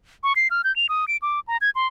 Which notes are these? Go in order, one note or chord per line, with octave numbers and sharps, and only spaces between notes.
C#6
C7
F6
G6
F7
D#6
D7
D6
A#5
G#6
C6